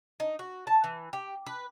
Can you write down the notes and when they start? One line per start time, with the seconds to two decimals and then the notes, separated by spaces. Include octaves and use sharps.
0.20 D#4
0.39 F#4
0.67 A5
0.84 E3
1.13 G4
1.46 B4